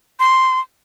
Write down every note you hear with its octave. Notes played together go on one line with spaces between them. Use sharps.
C6